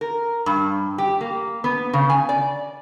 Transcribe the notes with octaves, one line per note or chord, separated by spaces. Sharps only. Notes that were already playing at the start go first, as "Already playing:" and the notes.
A#4
G2
G4
A#3
B3
C#3
G#5
D5